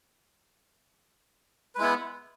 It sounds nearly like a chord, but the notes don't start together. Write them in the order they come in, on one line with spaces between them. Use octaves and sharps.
B4 G#3 E4 B3